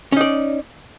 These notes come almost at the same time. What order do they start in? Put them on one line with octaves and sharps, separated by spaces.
C#4 D#4 D5